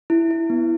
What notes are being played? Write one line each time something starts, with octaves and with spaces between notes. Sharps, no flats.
E4
E4
B3